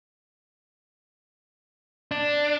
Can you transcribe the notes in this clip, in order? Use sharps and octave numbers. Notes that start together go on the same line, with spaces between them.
D4